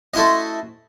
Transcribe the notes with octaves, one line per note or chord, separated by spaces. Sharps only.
A3 C#4 E4 F#4 C5 D#5